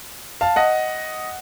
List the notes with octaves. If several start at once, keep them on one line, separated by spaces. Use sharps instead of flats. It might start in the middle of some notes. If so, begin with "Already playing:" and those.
F5 A5
D#5 F#5